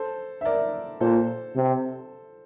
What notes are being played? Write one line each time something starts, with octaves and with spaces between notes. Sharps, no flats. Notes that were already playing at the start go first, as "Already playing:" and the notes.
Already playing: A4 C5
E5
A#4 D5
A#2 A4 C5
C3